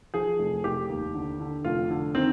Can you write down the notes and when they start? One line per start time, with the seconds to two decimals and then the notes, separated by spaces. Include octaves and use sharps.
0.14 F3 G#4
0.39 F1
0.64 F1 G4
0.89 D#2
1.15 D3
1.40 D3
1.64 F1 F4
1.90 D3
2.15 D#3 C4